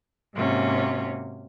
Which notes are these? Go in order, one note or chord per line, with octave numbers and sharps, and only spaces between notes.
G#2 C3 A#3 C#4 F4 F#4